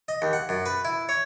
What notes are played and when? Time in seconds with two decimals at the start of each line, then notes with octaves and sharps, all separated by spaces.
0.08 D#5
0.22 D#2
0.33 F#5
0.49 F#2
0.66 B4
0.85 E4
1.09 C#5